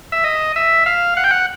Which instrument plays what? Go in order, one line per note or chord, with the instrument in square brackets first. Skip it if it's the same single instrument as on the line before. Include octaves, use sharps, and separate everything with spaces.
[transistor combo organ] E5
D#5
E5
F5
F#5
G5
F#5